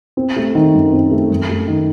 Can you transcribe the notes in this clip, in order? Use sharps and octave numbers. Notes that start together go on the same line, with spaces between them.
C4
A3
D#3
F#2
C4
A3
F#2
A3
D#3